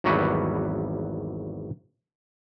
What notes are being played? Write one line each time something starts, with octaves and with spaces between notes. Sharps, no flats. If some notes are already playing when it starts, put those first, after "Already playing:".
G#1 E2 F#3 G3 F#4 B4